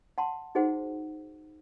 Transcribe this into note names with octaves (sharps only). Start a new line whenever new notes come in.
F#5 A5 C6
D#4 F#4 G#4 C5 F#5